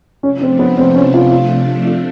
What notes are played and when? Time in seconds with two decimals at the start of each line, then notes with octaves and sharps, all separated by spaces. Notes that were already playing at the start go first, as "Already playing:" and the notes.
0.23 C3 F3 A3 C#4 D4
0.41 C4
0.59 B3
0.77 C4
0.95 C#4
1.14 F4
1.32 F4
1.85 F4